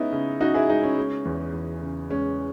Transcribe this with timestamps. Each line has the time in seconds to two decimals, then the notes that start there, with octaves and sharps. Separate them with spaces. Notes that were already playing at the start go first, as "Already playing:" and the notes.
Already playing: G#3 B3 C#4 D#4 E4
0.12 C#3
0.40 C#3 D#4 F#4
0.54 E4 G#4
0.69 G#3 D#4
0.83 C#4
0.97 G#3
1.25 E2
1.53 E2
1.82 C#3
2.10 G#3 C#4